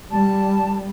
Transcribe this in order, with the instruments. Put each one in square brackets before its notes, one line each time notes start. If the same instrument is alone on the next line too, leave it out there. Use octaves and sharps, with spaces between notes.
[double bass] G3 [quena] A5